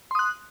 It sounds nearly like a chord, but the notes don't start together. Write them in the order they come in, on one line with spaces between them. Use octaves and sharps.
C6 D#6 F#6